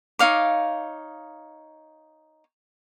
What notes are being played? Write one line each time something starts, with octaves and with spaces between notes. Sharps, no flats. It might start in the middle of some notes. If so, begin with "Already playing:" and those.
D#4 C#5 F5 D6